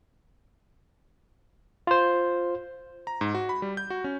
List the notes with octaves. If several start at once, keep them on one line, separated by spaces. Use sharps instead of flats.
F4 C5
A#5
G#2
F#4
B5
G3
G6
F#4
C#4